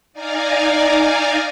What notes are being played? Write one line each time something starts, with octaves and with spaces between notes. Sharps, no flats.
D#4 D5 F5 G#5 A#5